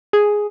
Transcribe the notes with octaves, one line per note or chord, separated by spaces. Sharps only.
G#4